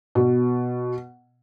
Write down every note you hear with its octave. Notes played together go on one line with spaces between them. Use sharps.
B2